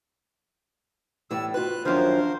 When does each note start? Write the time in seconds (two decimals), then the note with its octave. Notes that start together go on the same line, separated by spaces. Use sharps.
1.31 A2 E3 G3 E6
1.54 F4 F#4 B4 F#6
1.85 F#2 D#3 F3 D4 A#4 C5 F5